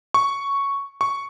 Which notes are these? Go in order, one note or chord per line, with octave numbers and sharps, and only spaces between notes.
C#6
C#6